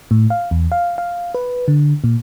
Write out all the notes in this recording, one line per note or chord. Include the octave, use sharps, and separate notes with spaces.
A2
F5
E2
F5
F5
B4
D3
A#2